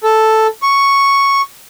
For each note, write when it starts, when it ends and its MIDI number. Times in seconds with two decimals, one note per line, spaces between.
0.04 0.47 69
0.62 1.42 85